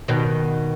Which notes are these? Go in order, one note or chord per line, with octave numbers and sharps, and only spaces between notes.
B2 D#3